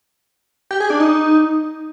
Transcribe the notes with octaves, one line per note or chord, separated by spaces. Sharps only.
G4
G#4
D4
D#4